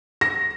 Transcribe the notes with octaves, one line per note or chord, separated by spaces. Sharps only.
A#6